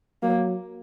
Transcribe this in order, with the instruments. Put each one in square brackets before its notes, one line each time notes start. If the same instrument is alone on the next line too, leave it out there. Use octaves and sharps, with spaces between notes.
[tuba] F#3 [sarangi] A#3